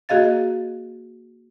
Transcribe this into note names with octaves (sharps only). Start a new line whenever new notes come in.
A#3 F#4 G#4 D#5 F5 A6